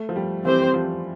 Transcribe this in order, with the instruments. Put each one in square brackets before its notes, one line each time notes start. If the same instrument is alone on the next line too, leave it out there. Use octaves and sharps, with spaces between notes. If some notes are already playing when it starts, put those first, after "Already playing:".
Already playing: [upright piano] A3
F3
G3
[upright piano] E3 [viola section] C4 G4 C5
[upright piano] F3